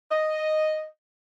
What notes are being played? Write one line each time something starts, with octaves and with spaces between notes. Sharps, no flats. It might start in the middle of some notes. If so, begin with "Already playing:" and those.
D#5